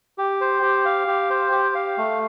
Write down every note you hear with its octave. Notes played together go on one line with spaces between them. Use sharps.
G4
C5
G4
F5
G4
C5
G4
F5
A3